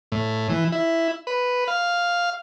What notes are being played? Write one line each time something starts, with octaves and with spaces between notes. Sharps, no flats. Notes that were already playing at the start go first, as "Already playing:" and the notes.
A2
E3
E4
B4
F5